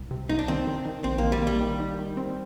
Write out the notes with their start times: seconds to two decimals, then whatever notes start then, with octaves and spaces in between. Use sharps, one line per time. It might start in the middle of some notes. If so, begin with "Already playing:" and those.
Already playing: C2
0.11 C3
0.29 C2 D#4
0.39 D4
0.48 D#3 C4
0.67 D#3
0.85 D#3
1.04 A#1 C4
1.18 A#3
1.23 D#3
1.32 G3
1.42 G3 A#3
1.61 D#3
1.80 D#3
1.98 D#3
2.17 C4